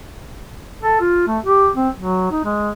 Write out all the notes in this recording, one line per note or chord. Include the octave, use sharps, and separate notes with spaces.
A4
F4
A3
G4
C4
F#3
D#4
G#3